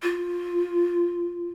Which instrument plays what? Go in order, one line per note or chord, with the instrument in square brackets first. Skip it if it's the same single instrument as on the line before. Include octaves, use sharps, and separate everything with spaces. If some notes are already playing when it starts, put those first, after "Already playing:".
[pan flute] F4